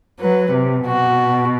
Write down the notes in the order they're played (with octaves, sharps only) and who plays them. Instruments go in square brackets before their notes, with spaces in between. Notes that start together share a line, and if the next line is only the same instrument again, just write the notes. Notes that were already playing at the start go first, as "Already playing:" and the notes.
[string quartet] F#3 [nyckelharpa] B4
[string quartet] C3
[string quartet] B2 [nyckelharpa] F#4